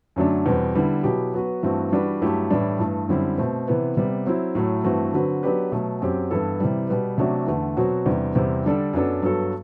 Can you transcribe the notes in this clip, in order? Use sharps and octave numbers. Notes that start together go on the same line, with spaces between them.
F#2 D3 F#3 A3 D4
E2 B2 G3 C4
D3 G3 B3 E4
B2 F#3 B3 E4 G4
F#3 B3 F#4 B4
G2 E3 A3 C4 F#4
E3 G3 D4 F#4 B4
G2 F#3 A3 E4 G4
A2 E3 G3 D4
G2 E3 A3
F#2 D3 G3 C4 E4
B2 A3 C4
C3 E3 B3
C3 G3 B3
F#3 C4 E4
A2 F#3 A3
G2 E3 A3 C4 F#4
D3 F#3 C4 F#4 B4
F#3 B3 D4 G4 B4
B2 F#3 A3
F#2 F#3 C4 G4
G2 E3 B3 E4 A4
C3 E3 G3
B2 G3 B3
C3 F#3 A3 D4 F#4
E2 D3 A3
B2 F#3 C4 F#4
E2 C3 E3 G3 D4
E2 C3 G3 C4
D3 G3 D4 A4
F#2 F#3 B3 D4 A4
G2 F#3 B3 F#4 A4